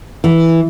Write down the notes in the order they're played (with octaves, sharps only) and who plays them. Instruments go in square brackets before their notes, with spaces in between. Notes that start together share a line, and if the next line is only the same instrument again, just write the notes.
[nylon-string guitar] E3